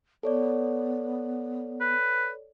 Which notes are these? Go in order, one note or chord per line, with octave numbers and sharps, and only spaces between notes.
B3 A4 C#5 D5
B4